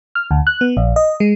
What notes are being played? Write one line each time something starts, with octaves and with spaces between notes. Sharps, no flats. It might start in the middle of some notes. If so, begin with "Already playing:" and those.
F6
D2
F#6
B3
A#1
D#5
G#3